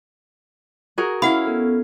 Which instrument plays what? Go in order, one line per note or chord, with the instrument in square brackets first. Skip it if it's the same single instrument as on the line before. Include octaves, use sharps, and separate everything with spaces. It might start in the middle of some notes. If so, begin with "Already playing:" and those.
[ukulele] F#4 G#4 A#4
[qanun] C#4 E4 F5 [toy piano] F#5 B5
[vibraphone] B3 A4